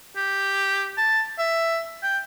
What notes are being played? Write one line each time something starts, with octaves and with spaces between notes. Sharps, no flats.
G4
A5
E5
G5